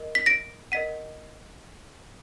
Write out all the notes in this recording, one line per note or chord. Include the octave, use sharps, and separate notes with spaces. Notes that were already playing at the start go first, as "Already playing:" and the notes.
Already playing: A#4 D#5
B6
A#6 D7
A#4 D#5 F#5 B6 D#7